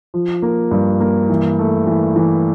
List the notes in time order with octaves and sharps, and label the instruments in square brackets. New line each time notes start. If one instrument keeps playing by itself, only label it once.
[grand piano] F3
A#3
G2
A#3
E3
A3
E3
E3